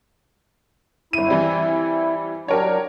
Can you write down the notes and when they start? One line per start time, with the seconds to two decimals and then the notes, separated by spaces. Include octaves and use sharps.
1.13 G1 E4 D#7
1.28 E3 G3 C4
2.48 F#3 D4 G4 A#4 C#5